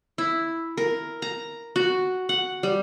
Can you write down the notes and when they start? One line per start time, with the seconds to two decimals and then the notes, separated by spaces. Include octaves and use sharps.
0.18 E4
0.77 A#4
1.22 A#5
1.76 F#4
2.29 F#5
2.63 G3